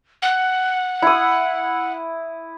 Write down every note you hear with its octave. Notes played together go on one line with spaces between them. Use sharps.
F#5
E4 D#6